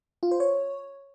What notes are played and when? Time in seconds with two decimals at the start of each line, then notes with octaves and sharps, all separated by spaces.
0.23 F4
0.31 C5
0.40 C#5